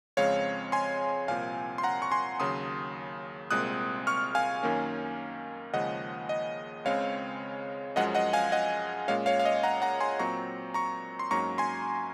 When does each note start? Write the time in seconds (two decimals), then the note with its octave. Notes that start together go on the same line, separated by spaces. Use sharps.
0.17 F2 C#3 G#3 C4 C#5 F5
0.72 G#5 C6
1.28 C2 A#2 F3 C4 F5 G#5
1.78 C6
1.83 F#5 A#5
2.02 C#6
2.12 G#5 C6
2.40 D#2 C#3 F#3 C6 D#6
3.50 C2 A#2 G#3 C4 D#6 F#6
4.07 C#6 F6
4.35 F5 G#5
4.63 F#2 D#3 A#3 C#4
5.73 D#2 C#3 F3 G#3 D#5 F#5
6.29 D#5
6.85 C#2 C#3 G#3 C4 C#5 F5
7.96 F#2 F3 G#3 C#4 D#5 F#5
8.15 D#5 F#5
8.33 F5 G#5
8.52 D#5 F#5
9.08 A#2 G#3 C#4 C#5 F5
9.26 C#5 F5
9.39 F5
9.45 D#5
9.63 F#5 A#5
9.82 F#5 A#5
10.00 G#5 C6
10.19 A#2 F#3 C4 A#5 C#6
10.74 A#5 C#6
11.19 C6
11.31 G#2 F#3 A#3 C#4 A#5 C#6
11.58 G#5 C6